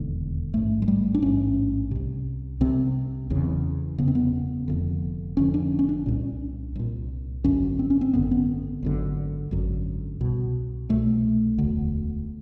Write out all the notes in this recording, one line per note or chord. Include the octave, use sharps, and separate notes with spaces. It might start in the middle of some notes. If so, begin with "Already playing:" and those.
Already playing: E1 D#2 D3
A1 G#2 A3
G#3
G3
D4
A1 G#2 C#4
C2 C3
C2 C3 C4
F#1 E2 C#3
F#1 E2 C#3 B3
C4
B3
F1 F2 D3
F1 F2 D3 C#4
D4
C#4
D4
C2 A#2
C2 A#2
G#1 F#2 D3 C#4
C4
C#4
C4
G#1 F#2 D3 B3
C4
B3
G#1 F#2 D3
G#1 F#2 D3
C2 B2
C2 B2 A3
E1 D2 D3